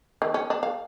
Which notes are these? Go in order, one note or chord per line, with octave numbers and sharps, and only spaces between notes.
D#3
C#4
D4
F5